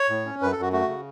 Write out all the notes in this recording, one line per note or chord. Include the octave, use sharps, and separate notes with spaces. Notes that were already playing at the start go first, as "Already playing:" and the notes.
Already playing: C#5
A2
C#4
F#2 B4
A4
F#2 F#4
A3 F#4
C#3